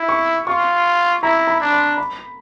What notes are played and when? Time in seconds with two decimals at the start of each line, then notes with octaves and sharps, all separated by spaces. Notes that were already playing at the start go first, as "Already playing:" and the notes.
Already playing: E4
0.09 C#6
0.47 F4 C#6
1.23 E4 A#5
1.48 B5
1.61 D4
1.73 C6
1.98 B5